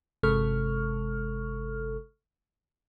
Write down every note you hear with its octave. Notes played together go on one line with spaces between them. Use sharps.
G1 C3 G#3 A4 C#6 F6